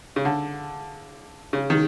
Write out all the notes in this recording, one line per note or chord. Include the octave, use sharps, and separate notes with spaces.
C#3
D3
C#3
D#3